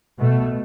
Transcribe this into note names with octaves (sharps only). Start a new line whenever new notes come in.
B2 A3